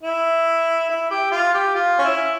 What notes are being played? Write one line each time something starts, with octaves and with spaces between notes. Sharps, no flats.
E4
E4
G4
F4
G4
F4
C#4
E4